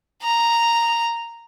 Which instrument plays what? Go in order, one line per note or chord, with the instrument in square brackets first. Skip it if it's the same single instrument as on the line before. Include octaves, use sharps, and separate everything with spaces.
[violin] A#5